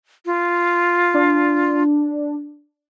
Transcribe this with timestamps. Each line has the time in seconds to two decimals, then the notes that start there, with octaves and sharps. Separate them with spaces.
0.26 F4
1.14 D4